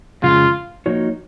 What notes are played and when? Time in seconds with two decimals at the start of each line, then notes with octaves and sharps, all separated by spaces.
0.22 F2 C#3 G#3 F4
0.86 F3 A#3 D#4 F#4 C#5